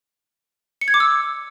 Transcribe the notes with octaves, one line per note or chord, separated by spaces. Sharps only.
C#7
G#6
D6
E6